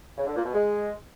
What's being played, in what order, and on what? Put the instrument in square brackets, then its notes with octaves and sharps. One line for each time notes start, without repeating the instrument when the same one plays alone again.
[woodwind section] C#3
D3
A#2
B2
G#3